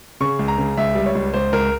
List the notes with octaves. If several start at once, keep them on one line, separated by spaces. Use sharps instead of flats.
C#3 C#6
C#2
A#5
C#3
C#2 E5
G3
C#5
C#2
C#2 C5
C#2 A#4